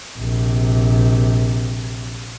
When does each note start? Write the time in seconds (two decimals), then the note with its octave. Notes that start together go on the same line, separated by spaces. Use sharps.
0.18 A#1 C3